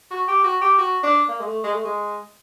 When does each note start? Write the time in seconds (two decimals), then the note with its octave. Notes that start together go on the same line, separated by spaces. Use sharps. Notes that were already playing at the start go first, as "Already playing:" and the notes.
0.11 F#4
0.28 G4
0.44 F#4
0.61 G4
0.78 F#4
1.03 D4
1.29 A#3
1.40 G#3
1.46 A3
1.64 G#3
1.74 A3
1.84 G#3